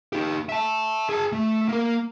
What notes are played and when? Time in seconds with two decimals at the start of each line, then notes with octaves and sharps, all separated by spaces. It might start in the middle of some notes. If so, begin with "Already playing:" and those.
0.13 D#4 G4
0.49 E5 A5
1.09 G#4 A5
1.32 A3
1.68 A#3 A#4